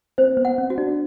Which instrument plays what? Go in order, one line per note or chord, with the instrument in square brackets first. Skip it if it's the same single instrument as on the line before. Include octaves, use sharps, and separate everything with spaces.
[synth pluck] C4 [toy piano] C5
[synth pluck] B3
[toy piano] F#5
[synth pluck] C4
[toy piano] F#4
[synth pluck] D4